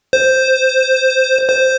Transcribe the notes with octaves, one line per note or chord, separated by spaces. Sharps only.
C5
C5